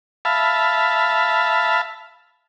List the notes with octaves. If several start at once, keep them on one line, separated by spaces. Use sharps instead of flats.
E5 F5 A5 B5